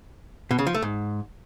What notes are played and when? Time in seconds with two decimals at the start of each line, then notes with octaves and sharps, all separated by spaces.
0.51 B2
0.59 C#3
0.67 F3
0.75 A3
0.82 G#2